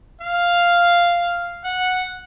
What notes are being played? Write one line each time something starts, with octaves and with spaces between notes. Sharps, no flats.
F5
F#5